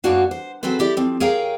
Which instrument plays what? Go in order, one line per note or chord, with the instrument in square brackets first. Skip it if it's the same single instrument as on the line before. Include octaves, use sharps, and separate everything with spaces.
[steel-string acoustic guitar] F#2 A#3 B3 D4 F#4 F5
C5
C#3 F#3 C4 A4 B4 C5
E4 G4 D5
F3 C4
G#4 A#4 C#5 F5 G5 A#5